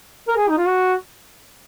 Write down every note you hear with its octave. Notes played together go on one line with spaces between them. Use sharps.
A#4
G#4
D#4
F4
F#4